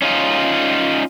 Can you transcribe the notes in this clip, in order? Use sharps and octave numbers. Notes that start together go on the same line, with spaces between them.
C#4 D#4 F4